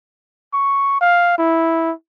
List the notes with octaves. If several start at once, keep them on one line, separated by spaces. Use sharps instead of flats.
C#6
F5
E4